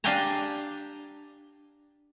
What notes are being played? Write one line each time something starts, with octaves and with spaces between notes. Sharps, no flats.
D4 G4 F5 G5 G#5 A#5